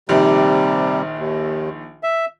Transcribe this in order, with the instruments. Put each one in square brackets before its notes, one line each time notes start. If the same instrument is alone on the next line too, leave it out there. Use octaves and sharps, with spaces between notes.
[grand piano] A#1 D#3 [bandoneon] C3 G3
[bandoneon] D#2
E5